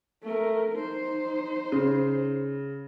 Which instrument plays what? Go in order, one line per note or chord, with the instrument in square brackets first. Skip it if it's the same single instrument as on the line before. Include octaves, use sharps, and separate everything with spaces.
[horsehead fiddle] A3 A#4
D#4 C5
[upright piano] C#3